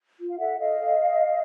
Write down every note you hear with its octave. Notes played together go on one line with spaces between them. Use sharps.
F4
F5
A4 E5 F#5
A4 D#5 F5
A4